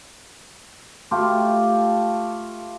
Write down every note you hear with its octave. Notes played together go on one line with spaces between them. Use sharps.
A3 F4 G4